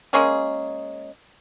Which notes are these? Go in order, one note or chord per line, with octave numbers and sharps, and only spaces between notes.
G#3 A#3 C#4 G#4